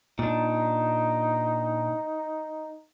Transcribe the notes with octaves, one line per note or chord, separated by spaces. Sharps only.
A#2 D4 D#4